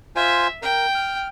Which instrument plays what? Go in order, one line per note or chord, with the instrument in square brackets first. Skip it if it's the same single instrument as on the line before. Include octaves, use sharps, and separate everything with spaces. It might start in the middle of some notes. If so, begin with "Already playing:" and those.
[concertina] F4 C5 G#5 [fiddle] E5
[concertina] A#4 [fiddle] G5
[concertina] F6